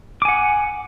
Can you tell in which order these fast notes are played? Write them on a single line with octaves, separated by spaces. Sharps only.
D6 G#5 F#5